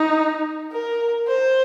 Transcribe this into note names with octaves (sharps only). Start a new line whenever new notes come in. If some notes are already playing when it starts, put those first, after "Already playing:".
Already playing: D#4
A#4
C5